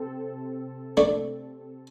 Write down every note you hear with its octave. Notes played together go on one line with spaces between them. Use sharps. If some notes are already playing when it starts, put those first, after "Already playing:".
Already playing: C3 C4 A4
A3 D4